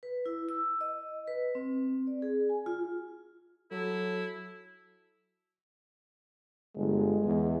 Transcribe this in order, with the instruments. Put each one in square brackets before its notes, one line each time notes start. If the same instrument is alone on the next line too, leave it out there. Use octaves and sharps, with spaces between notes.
[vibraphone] B4
E4
E6
D#5
B4
C4
D5
G#4
G#5
F4
[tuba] F#3 [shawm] E4 [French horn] A4
[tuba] G1 [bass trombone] G#3
[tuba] E2